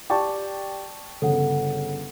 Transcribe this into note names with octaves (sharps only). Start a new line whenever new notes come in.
G4 D5 G5 A5 C#6 D6
G1 C#3 A4 F#5